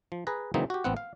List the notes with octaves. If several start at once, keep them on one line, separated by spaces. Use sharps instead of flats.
F3
G#4 B4 A#5
C#3 E3 F#3 A#3 C4 D#4
F#4 G4
A1 B3 C4 F#5
F5